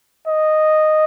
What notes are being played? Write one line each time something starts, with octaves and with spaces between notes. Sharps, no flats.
D#5